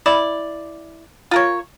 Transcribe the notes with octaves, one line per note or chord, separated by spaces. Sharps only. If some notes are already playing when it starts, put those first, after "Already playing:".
E4 D5
F4 A#4 C#5